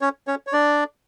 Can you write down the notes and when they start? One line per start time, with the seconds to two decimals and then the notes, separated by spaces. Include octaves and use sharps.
0.01 C#4 C#5
0.27 C#4 C#5
0.47 C#5
0.53 D4 D5